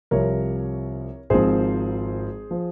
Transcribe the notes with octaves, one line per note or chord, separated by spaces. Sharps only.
C2 C3 F3 C4 A#4 C#5
G#1 G#2 F3 C4 G#4 C5
F3